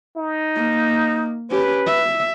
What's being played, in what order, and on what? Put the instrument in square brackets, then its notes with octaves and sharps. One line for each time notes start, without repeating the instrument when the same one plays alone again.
[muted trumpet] D#4
[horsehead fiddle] A#3
[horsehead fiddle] C#4 G4 [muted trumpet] B4
[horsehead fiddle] E5